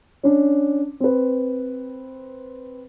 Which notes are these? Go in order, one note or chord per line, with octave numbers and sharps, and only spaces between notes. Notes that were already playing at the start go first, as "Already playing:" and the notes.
C#4 D4
C4 B4